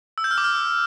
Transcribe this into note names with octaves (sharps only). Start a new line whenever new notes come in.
E6
G6
F6
D6
F6